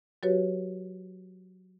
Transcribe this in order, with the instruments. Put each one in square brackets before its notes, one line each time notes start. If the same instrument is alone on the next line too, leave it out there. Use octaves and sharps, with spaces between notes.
[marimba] F#3 F#4 G4 B4 C#5